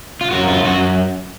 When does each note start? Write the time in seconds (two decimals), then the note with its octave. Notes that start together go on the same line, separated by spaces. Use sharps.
0.21 F4
0.31 F#2 F#4
0.47 F4
0.63 F#2 F#4